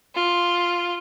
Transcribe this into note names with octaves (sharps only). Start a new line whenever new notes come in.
F4